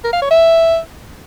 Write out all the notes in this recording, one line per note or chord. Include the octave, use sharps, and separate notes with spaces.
A#4
F5
C#5
E5